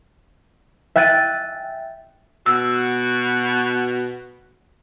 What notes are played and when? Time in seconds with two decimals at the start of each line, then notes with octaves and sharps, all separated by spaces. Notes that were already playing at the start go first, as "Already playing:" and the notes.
0.96 E5 G5 F#6 A6 D7 D#7
2.46 B2 F#4 E6